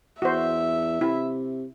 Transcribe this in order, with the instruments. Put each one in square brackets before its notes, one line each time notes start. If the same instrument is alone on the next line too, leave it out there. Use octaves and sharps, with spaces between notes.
[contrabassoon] E2 [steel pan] F#4 C5 [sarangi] E5
[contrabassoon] C3 [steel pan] E4